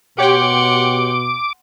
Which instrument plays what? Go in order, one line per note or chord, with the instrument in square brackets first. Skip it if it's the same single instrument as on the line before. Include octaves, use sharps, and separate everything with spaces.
[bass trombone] B2 [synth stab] G4 C#5 G5 [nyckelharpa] F#5 C6 [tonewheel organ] D6